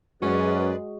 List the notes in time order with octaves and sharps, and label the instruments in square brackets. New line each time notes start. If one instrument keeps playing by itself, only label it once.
[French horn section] F#2 [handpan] G#3 F#4 [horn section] C#4 [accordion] G#4 B4 D5